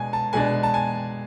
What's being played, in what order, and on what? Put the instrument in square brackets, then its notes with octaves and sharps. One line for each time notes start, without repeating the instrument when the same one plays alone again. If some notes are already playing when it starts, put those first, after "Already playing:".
Already playing: [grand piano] B2 G#3 D4 G#5
A5
B2 G#3 D4 G#5
A5
G#5